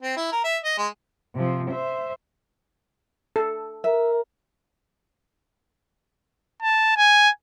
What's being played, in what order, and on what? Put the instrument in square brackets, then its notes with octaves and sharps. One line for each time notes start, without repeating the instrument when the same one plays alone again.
[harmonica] C4
E4
A#4
E5
D#5
G#3
[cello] C3 F3
C5 E5
[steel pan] A4
[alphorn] A#4 [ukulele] E5
[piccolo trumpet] A5
G#5